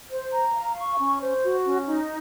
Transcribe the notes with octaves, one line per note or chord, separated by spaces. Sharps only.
C5
A#5
F5
C#6
C#4
C5
F#4
C#4
D#4